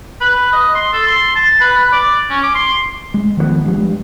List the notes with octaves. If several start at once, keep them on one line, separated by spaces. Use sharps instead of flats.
B4
D#5
C6
A4
C6
A5
B4
B4
D5
C#4
D6
C6
G#3
D#3 F3 G3 B3
G2 F3 G3 G#3